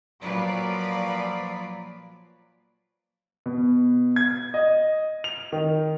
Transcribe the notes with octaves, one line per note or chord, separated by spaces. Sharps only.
A#2 F3 F#3 B4 D5
B2
G#6
D#5
F7
D#3